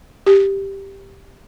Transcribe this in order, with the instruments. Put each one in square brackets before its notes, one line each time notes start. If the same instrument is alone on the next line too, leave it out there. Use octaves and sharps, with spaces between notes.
[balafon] G4